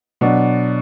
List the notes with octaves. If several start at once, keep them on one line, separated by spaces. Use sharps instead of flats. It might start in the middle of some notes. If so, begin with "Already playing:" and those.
B2 F#3 D4